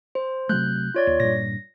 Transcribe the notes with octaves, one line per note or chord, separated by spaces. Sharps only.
C5
C3 F#3 A3 F#6 G6
F4 C#5 D5
D#2
G2 A#2 A#6